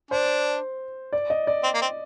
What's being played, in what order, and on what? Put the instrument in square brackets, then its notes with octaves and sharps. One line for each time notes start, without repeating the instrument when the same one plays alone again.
[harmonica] D4 [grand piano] C5
[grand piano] D5
D#5
D5
[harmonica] C4
A#3
C4